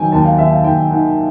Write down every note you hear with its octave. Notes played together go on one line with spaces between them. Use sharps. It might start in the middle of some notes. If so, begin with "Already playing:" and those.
Already playing: D#3 F#3 G5 G#5
D#2 A5
F5
D#2 E5
F5
D#2 G5
D#3 F#5